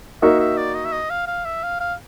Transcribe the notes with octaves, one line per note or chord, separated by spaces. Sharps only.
A#3 D#4 F#4 E5
E5
D5
D#5
E5
D#5
F5
F5
E5
F5
F5